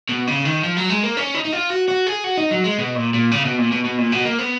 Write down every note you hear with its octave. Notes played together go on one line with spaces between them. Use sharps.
B2
C#3
D#3
F3
F#3
G#3
A#3
C#4
D#4
D#4
F4
F#4
F#4
G#4
F#4
D#4
F#3
G#3
B2
A#2
A#2
C#3
B2
A#2
B2
B2
A#2
B2
A#3
B3